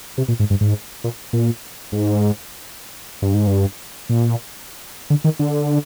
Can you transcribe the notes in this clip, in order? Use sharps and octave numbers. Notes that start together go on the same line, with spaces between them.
C3
A#2
G#2
G2
G#2
A#2
A#2
G#2
G2
G#2
G2
A#2
D3
D#3
D3